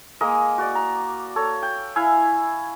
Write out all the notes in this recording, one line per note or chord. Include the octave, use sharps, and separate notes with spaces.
G#3 A#3 A#4 D#5
F#4 D5
A#5
A4 C#5
G5
E4 E5 F5 G#5